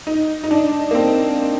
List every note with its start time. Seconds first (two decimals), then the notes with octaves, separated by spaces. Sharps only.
0.07 D#4
0.44 D#4
0.51 D4
0.91 A#3
0.95 C4